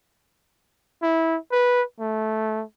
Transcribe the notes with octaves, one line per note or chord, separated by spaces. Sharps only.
E4
B4
A3